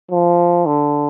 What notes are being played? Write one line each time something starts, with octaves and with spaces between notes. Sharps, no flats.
F3
D3